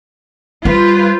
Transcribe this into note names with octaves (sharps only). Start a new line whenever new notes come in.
G3 F4 B4 C5